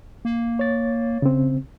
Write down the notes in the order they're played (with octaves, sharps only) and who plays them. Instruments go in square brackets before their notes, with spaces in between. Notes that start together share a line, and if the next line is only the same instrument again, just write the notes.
[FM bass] A#3
[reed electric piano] C#5 A6
C#3 C4